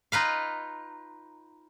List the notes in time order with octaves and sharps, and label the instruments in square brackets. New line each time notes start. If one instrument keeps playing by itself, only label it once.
[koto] D#4 F4 B4 F5